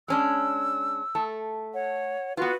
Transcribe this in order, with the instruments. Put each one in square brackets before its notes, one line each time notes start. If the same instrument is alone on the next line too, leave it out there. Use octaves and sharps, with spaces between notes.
[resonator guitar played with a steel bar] G#3 C#4 D4 [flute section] E6
[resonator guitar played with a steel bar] A3 A4
[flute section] C#5 F#5
[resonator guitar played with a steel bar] B3 F4 [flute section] F#4 B4